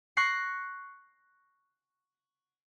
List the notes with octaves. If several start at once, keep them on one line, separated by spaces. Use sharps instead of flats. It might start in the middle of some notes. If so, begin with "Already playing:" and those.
C#6 F#6 A#6 C7 C#7